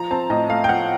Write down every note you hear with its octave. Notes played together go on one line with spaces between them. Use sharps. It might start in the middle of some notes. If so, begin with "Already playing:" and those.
Already playing: F3 A#5
C4 A5
A2 D#5
A3 F5
G5
F3 F#5